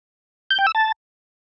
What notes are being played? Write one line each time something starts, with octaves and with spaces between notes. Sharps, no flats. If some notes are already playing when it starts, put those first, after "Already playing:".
G6
G5
E6
A5